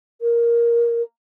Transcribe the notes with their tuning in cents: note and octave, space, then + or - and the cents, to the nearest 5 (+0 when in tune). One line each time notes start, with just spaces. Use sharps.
A#4 +10